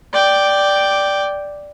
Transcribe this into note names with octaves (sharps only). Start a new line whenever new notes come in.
D5 G5